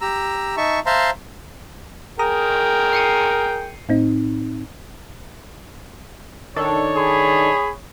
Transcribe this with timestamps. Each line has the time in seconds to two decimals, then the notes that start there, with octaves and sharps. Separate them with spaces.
0.01 G4 A#5 E6
0.57 D#4 E5 A5 C#6
0.86 C5 E5 F5 A5 A#5 C6
2.19 G#4 A#4 G5 A#5 D#6
2.93 C7 C#7 D#7
3.89 A2 C4 D#4
6.56 D#3 D4 A4 C#5
6.95 G#4 B5